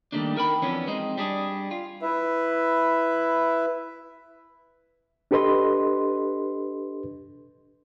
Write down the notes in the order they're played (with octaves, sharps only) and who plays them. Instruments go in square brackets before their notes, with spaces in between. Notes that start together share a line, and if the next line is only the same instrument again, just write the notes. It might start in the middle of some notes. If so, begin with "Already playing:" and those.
[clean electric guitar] D#3 G3 A3 A#3 D4
D#4 A#4 G5 B5
F2 E3 B3 C#4 D4
G#3 C4 D#4
G3 D4 G#4
F4
[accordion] E4 B4 E5
[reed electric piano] D4 G4 A4 B4 D#5 C6